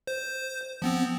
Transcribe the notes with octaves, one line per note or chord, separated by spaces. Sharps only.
C5
F3 B3 C4